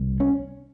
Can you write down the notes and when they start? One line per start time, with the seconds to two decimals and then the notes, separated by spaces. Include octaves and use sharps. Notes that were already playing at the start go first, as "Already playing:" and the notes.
Already playing: C2
0.20 C#4